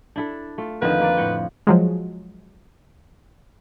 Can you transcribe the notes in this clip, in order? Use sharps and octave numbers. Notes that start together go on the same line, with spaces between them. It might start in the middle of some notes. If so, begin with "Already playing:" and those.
D4 E4 A4
A3 F4
F2 D3 D#3 F3 B4
A#3 D5
A2 F#5 G5
F3 F#3 G#3